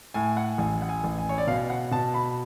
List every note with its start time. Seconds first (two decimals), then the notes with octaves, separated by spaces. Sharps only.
0.14 A2 G#5
0.37 F#5
0.58 A1 G#5
0.82 F#5
0.89 G#5
1.04 A1
1.19 G#5
1.29 C#5
1.38 D5
1.47 B2 F5
1.70 F#5
1.91 B2 A5
2.14 B5